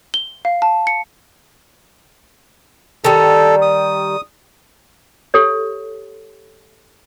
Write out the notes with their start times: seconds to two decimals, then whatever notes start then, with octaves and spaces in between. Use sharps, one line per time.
0.14 G7
0.45 F5
0.62 A5
0.87 C#7
3.04 D#3 G3 A4
3.62 D#6
5.34 G4 A4 C#5